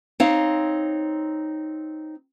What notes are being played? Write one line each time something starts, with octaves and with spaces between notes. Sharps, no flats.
C4 D#4 C#5 F5